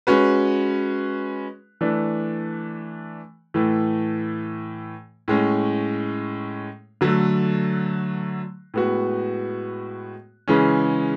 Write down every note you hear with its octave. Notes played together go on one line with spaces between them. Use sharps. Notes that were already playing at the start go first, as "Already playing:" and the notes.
G#3 C#4 F#4 B4
E3 A3 D4
A2 E3 A3
A2 G#3 C#4
D3 F#3 A3
A2 G#3 B3 F#4
C#3 E3 G#3 C#4